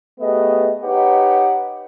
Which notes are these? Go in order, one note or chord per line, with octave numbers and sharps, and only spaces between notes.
A3 B3 G4 G#4 D#5
D#4 G4 B4 C#5 F#5